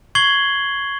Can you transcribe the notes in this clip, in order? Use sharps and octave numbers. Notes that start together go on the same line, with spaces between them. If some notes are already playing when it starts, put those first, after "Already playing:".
C#6 G#6 C7 F#7 G7